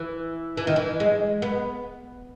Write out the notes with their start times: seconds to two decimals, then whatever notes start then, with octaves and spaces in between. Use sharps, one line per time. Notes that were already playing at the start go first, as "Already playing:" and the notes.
Already playing: E3
0.57 E3
0.67 D#3
0.76 E3
1.00 G#3
1.42 B3